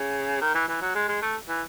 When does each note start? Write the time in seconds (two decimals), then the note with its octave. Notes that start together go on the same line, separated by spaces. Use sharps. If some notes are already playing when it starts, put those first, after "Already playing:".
Already playing: C#3
0.41 D#3
0.55 E3
0.68 E3
0.81 F#3
0.95 G#3
1.08 G#3
1.22 A3
1.48 E3